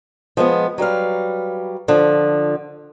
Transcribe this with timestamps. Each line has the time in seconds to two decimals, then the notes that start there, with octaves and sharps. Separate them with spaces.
0.37 F3 G#3 B3
0.78 F#3 G3 B4 F5
1.88 D3 F3